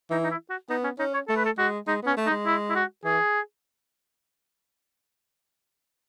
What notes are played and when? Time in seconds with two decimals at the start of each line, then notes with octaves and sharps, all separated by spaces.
0.10 E3 D#4
0.23 D#4
0.30 E4
0.50 F#4
0.70 B3 D#4
0.84 C#4
0.99 C#4 D#4
1.14 C#5
1.28 A3 A4
1.37 B4
1.45 A4
1.58 G#3 F#4
1.87 G#3 D#4
2.03 B3 C#4
2.17 A3
2.26 D#4
2.31 G#3
2.46 E4
2.70 E4
2.75 F#4
3.04 E3 G#4